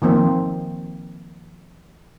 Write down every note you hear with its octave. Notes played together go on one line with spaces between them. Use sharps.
D#3 F3 A#3 C4